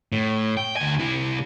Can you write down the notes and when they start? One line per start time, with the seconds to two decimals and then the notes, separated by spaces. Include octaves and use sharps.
0.12 A2
0.57 G5
0.76 D2 G#5
0.99 C3 E4